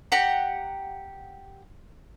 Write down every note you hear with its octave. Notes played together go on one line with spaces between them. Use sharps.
G4 F#5 A#5